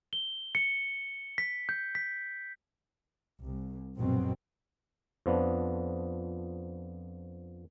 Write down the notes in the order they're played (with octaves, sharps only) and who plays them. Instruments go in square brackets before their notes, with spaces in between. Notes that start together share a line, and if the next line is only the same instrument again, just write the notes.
[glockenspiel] G7
C#7
B6
G6
B6
[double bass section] C2
A#1 F#2 B2 F#3 C4
[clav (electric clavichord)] F2 F3 B3 D4